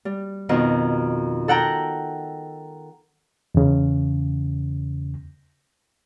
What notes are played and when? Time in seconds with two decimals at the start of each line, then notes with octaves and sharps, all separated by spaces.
0.05 G3
0.49 F2 B2 D#3
1.48 A4 F#5 G5 A#5
3.55 E2 C#3